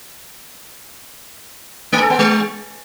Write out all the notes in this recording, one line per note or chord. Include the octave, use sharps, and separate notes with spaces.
A3
A4
B3
G#3